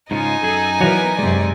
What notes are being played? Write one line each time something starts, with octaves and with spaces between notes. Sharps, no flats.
G#2 C#3 D#4 F4 G#5
F#2 G#4 A4
E3 F#3 B3 A#4 D5 F#5 A#5
F#2 C3 G#3 D5